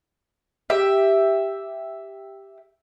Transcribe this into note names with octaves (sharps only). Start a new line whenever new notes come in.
G4 E5